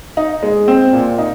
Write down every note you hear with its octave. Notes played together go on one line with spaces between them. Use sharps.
D#4
G#3
C4
A#2
D#4